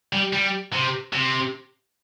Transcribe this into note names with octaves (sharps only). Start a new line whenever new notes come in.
G3
G3
C3
C3